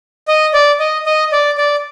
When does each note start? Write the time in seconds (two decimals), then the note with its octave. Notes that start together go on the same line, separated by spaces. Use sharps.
0.28 D#5
0.54 D5
0.79 D#5
1.06 D#5
1.32 D5
1.58 D5